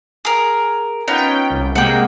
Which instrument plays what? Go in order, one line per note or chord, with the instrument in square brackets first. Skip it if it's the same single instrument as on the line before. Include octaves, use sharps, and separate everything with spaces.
[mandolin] G#4 A#4
[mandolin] B3 D#4 F4 [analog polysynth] C#4 G5
[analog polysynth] C2
[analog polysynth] C3 G#3 A#3 [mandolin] F#5 G5